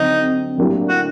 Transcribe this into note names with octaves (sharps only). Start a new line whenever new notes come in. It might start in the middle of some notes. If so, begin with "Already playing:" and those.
Already playing: D3 F#3 C4 D#4
A2 F#3 A#3 D4 G4
F#4